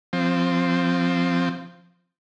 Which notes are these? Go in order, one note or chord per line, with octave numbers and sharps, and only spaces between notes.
F3 C4